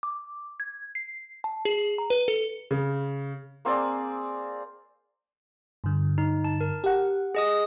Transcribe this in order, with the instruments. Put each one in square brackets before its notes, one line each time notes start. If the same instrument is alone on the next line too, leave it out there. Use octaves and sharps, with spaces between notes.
[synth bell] D6
G#6
C7
A5
G#4
A#5
B4
A4
[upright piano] C#3
[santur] A#3 C4 G#4 D5
[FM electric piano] G2 D3
[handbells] D#4
A5
A#4
[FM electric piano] G4 F#5
[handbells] G#4 D#5 D#6